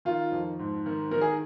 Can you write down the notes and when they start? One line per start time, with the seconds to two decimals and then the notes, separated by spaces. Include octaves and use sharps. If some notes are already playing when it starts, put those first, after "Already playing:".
0.05 D#3 F4
0.32 F2
0.59 G#2
0.86 D#3
1.11 D#3 A#4
1.21 G#4